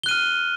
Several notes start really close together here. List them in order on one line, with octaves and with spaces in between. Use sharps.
G7 F#6 D#7 F6